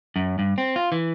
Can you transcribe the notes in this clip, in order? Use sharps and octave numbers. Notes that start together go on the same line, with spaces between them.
F#2
G2
C4
F4
E3